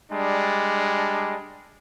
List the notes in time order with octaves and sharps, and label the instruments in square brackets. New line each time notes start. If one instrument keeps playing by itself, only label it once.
[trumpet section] G3 G#3 D4